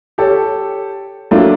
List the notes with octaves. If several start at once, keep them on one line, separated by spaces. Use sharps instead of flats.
G4 A4 C#5
F#3 A3 A#3 D4 E4 F4